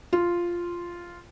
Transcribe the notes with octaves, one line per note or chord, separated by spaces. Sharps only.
F4